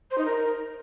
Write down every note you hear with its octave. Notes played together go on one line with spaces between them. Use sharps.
C5
D#4
A#4